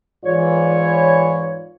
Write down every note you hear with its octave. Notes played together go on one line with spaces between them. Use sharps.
G#2 E3 F4 C#5 D5